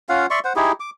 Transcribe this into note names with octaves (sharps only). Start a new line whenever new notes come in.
C#4 F4 F5 F#5
D5 E5 C6 C#6
C5 F#5
D#4 E4 G4 G#4
D6